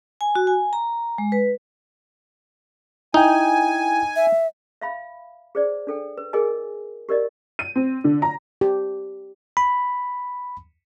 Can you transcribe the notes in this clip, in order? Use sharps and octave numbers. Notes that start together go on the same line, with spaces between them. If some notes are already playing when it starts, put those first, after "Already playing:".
G#5
F#4
G#5
A#5
G#3
B4
D#4 E4 G5 G#5
E5
E5 F5 B5
G#4 C5 D5
D4 A4 G5
B4
G#4 A#4 D#5 G#5
G4 A#4 D5 D#5
D#7
C4
D3
A#5
G4
B5